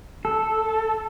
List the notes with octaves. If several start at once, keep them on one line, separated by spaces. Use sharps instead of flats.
A4